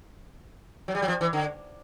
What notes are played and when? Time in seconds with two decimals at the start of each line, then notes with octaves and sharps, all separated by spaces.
0.88 F#3
0.95 G3
1.02 F#3
1.08 F3
1.21 E3
1.33 D3